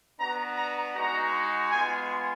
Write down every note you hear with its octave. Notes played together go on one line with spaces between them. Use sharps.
B3 D4 F#4 A#5
A#5
G#3 D#4 F#4 A#5
G#3 B3 F4 G#5